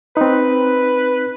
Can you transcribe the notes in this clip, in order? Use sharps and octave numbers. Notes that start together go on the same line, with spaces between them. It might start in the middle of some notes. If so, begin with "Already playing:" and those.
C4 D#4 B4